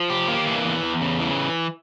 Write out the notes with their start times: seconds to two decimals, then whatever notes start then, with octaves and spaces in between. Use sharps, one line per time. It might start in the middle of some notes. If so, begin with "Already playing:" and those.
Already playing: F3
0.10 G4
0.28 A#3
0.46 E3
0.65 E2
0.83 E2
1.02 C#3
1.20 E3